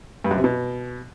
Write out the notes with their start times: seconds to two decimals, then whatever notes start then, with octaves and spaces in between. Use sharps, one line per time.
0.24 G2
0.31 F#2
0.37 C3
0.44 B2